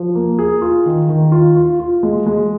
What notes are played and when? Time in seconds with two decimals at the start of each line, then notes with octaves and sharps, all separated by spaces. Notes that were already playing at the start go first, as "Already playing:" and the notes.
Already playing: F3
0.15 A#3
0.39 G#4
0.62 F4
0.86 D#3
1.09 D#3
1.32 F4
1.56 F4
1.79 F4
2.03 G#3
2.26 G#3